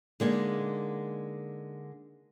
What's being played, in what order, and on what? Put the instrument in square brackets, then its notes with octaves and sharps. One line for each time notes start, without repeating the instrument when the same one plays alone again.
[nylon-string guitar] D3 G#3 A#3 D#4